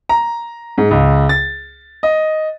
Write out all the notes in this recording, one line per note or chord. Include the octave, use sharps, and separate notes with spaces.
A#5
G#2
C#2
A6
D#5